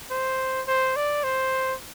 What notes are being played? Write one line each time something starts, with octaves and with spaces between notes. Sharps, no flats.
C5
C5
D5
C5